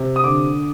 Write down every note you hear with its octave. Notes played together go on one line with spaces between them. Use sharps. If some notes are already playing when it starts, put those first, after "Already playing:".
Already playing: C3
D#6
D3 D6